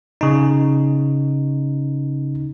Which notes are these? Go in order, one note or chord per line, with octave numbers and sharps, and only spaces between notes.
C#3 D#4